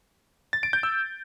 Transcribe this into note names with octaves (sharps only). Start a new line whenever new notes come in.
A6
D7
G6
E6